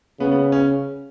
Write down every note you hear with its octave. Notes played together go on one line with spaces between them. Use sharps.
C#3 B3
B3
C#4